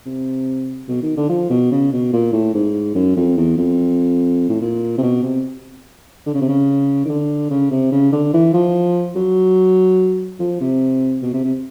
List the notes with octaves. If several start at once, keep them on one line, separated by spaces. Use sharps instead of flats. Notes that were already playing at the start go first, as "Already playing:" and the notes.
C3
B2
D#3
D3
F3
B2
C#3
B2
A#2
A2
G#2
F#2
F2
E2
F2
A2
A#2
C3
B2
C3
D3
C#3
C3
C#3
D#3
D3
C#3
C3
C#3
D3
E3
F3
F#3
F3
C3
B2
C3
C3